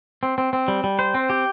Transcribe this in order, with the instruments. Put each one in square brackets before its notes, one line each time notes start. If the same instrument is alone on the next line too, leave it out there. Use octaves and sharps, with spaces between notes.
[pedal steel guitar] C4
C4
C4
G3
G3
C5
C4
G4